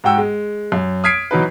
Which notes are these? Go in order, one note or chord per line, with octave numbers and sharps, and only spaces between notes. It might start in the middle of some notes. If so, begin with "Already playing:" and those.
G#2 F#4 F#5 G5 E6
G#3
F#2
D#6 F6 G#6 B6 C7 D7
E3 F#3 D#4 B4